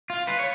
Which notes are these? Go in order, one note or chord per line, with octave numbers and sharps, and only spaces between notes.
F4
B4
C#5